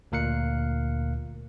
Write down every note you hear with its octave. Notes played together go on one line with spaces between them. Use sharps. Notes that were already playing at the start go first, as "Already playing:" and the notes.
D2 A#2 A#4 F5 F#6 C#7